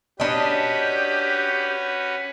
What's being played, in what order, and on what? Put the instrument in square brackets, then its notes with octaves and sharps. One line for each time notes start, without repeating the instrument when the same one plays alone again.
[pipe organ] C#4 F#4 B4 [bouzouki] D4 D#5 [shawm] G4